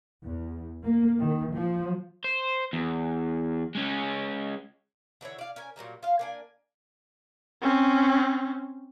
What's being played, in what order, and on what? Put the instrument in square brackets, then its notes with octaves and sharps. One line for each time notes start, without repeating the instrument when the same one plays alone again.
[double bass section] E2
A#3
D#3
F3
[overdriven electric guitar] C5
E2
G#3 C#4
[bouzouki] D3 E3 E4 C#5
D5 F5
C#4 A#4 G#5
A#2 F#3 G3 A#3
F4 F5
A#3 D4 G#5
[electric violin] C4 C#4